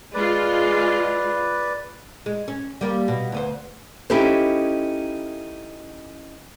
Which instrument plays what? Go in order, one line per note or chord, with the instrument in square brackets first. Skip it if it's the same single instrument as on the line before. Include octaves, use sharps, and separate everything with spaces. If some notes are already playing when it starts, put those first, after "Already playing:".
[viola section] G#3 F4 [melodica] B4 D5
[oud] G#3
C#4
G3 A#3
B2
D2 B3 C5
[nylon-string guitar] C#4 D#4 E4 G4 A4 C5